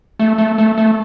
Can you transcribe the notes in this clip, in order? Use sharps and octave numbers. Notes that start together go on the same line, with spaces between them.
A3
A3
A3
A3